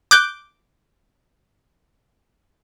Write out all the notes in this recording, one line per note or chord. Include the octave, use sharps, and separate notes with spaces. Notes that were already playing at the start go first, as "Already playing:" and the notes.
D6 F#6 G6